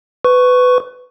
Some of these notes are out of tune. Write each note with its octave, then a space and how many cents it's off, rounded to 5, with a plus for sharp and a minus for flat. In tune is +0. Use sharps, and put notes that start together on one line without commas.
B4 +20 C#6 +0